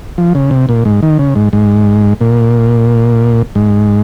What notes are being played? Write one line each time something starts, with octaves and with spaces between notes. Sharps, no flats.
F3
C#3
C3
A#2
G#2
D#3
C#3
G#2
G#2
A#2
G#2